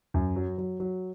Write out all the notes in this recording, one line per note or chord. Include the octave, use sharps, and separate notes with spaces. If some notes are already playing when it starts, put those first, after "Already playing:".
F#2
F#3
F#3
F#3